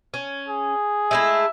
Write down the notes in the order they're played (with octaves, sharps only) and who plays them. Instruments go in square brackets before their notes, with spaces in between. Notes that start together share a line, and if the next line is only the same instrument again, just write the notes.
[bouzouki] C#4
[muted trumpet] G#4
[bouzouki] G#3 A3 E4 [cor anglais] E5